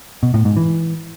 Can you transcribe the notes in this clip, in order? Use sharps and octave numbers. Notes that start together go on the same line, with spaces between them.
B2
A2
G#2
E3